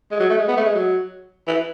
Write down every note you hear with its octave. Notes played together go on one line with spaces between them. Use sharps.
G#3
F#3
A3
G#3
B3
A3
G#3
F#3
E3